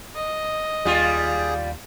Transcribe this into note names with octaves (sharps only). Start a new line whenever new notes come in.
D#5
D#2 G3 F4 G#4